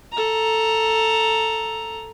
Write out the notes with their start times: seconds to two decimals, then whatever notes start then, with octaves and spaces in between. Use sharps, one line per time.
0.13 A4 A#5